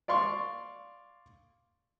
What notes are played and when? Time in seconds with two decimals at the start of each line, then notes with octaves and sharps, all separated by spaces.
0.08 D5 F5 C6 C#6